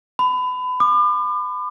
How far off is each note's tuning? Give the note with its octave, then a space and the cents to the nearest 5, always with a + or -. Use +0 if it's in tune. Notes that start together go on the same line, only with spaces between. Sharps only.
B5 +30
D6 +40